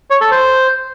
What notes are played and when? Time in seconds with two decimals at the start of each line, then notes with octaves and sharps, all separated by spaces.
0.10 C#5
0.21 A4
0.31 C5